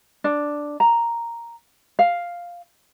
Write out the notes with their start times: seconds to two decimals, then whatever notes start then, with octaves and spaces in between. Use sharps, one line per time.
0.24 D4
0.80 A#5
1.99 F5